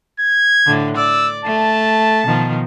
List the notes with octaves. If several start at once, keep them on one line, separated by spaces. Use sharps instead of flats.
G#6
A2 D3
D5 E6
A3 A5
B2 D#3 F3